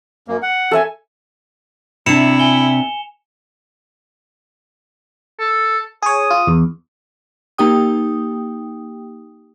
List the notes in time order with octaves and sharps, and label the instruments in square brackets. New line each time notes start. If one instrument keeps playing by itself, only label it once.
[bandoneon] F#2 A#3
F#5
[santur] A4 E5 G#5
[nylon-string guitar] C3 D4 [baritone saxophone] E4 [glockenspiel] C#7 E7 F7
[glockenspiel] G#5 G7
[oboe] A4
[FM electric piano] G#4 C#5 [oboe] D#6
[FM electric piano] F4
E2
[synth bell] A#3 D#4 G4 G5 D#6